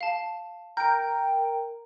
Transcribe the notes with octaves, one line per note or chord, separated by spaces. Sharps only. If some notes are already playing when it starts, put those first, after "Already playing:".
F5 A5
A#4 G5 G6 D7